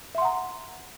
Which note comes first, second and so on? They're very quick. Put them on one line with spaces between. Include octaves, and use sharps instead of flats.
E5 C6 F#5 A#5